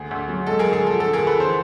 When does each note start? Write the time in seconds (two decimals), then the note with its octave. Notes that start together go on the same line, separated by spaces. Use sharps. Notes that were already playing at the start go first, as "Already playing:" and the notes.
Already playing: D2 G#4
0.11 D2
0.28 F#3
0.47 G#3 A4
0.59 D2 G#4 A#4
0.73 G#4
0.82 F3 A4
1.00 D2 A4
1.13 D2 G#4 A#4
1.27 A4 B4
1.36 E3 A#4 C5